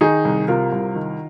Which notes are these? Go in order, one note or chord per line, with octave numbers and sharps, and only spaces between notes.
D#3 D#4 G#4
C2
C3 F4 A#4
C2
D#3